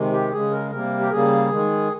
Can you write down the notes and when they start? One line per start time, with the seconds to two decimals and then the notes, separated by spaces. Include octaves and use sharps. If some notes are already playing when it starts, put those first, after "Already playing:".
Already playing: C3 D#3 G#3
0.12 G4
0.32 C#3 G#3 G#4
0.52 A#4
0.71 C3 G3 A#3 A#4
1.00 G4
1.10 C#3 G3 A#3 G#4
1.50 D#3 G#3